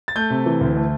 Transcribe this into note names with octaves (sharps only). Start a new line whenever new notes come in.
A6
A3 G6
C3
E3
D2
A3